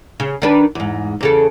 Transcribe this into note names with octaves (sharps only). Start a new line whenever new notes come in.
C#3
D#3 D4 B4
E2 G#2
E2 C#3 A4